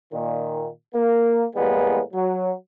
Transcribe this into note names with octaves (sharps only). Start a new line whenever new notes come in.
A#2 D#3
A#3
A2 E3 G3 G#3 A#3 B3
F#3